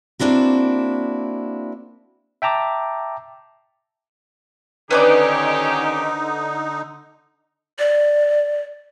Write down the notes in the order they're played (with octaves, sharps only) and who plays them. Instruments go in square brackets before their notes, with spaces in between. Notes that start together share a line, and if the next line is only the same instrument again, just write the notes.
[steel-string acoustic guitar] A#3 C4 D4 E4 F#4
[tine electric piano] E5 G5 A5 A#5 D6
[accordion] D3 D#4 [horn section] D#3 C#4 G4 [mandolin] B4 C5 D5
[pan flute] D5